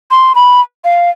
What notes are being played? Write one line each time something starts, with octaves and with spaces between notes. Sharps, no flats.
C6
B5
F5